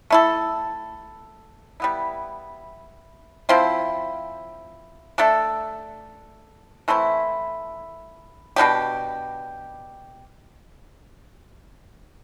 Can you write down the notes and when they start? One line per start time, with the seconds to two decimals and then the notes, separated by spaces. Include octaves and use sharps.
0.10 A3 E4 A4
1.80 G3 B3 E4
3.49 F3 C4 E4
5.18 A3 D4 A4
6.88 E3 A3 C4 E4
8.56 B2 G3 D4 G4